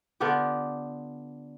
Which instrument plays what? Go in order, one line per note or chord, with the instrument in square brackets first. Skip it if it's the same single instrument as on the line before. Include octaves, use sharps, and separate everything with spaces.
[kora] D3 B3 F4 G4